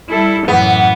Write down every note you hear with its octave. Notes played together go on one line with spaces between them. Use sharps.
G3 E4 A4
F#2 A2 E3 B3